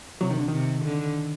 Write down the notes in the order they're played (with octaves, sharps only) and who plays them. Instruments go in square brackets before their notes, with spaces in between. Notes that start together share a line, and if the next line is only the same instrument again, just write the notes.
[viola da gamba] C3 [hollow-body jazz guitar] F#3
[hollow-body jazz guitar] D#3
D3
[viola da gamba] C3 [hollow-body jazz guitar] D#3
[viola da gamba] D3